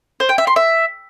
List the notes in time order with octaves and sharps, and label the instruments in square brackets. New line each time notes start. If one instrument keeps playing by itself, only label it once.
[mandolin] C5
G5
E5
C6
E5